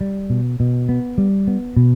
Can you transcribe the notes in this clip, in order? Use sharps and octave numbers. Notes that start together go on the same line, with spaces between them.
G3
B2
B2
B3
G3
B3
B2